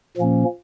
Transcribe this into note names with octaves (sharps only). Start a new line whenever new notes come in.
A#2 F3 A#3 C#4